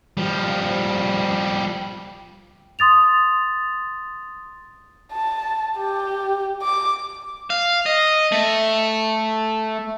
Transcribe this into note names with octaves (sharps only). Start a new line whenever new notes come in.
F3 G3
C6 D#6 A6 F7
A5
G4
D6
F5
D#5
A3